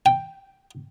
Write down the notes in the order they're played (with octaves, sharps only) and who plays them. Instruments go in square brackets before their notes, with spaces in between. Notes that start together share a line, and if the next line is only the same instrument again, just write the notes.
[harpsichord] G5